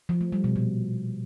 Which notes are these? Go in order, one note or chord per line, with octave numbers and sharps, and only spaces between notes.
F3
A3
G3
B2
A#2